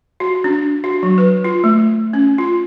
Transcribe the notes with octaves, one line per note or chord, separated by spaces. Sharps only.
F#4
D4
F#4
F#3
B4
F4
A3
C#4
F4